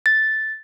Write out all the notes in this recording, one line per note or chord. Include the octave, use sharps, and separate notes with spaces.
A6